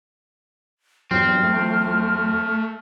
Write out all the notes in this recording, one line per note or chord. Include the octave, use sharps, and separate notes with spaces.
E2 G2 F3 F#3 C4 F6
A3